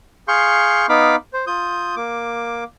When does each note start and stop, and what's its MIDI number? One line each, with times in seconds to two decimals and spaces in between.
0.28 0.86 68
0.28 0.86 77
0.28 0.86 84
0.28 0.86 85
0.28 0.86 91
0.89 1.16 59
0.89 1.16 63
0.89 1.16 77
0.89 1.16 83
0.89 1.16 86
1.33 1.45 72
1.47 1.95 65
1.47 1.95 87
1.47 1.95 91
1.96 2.64 58
1.96 2.64 86